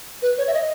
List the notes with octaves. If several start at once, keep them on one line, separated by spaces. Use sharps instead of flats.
B4
C#5
E5
D#5